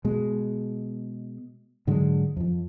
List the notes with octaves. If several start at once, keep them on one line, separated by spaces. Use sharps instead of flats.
B2 G#3
G#2 D3 F#3 G#3
F2 F3